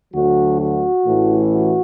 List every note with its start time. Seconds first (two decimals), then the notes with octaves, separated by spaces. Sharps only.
0.13 D2 D3 F#3 F#4
0.60 F#4
1.06 A1 A2 E3
1.53 F#4